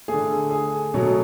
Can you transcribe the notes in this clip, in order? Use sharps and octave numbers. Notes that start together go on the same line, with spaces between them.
A3 G#4
D3
G#4
B2 F#3 A3